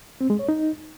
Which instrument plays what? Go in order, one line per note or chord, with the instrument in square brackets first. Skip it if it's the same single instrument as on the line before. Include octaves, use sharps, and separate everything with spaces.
[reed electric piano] C4
G#3
C#5
D#4